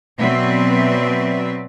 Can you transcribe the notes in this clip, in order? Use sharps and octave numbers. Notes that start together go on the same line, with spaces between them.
B2 F#3 C4 B4 D5 E5